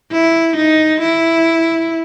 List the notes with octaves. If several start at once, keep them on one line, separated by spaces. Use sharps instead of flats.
E4
D#4
E4